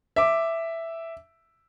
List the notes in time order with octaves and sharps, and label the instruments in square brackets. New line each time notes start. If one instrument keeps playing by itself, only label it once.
[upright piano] E5 D6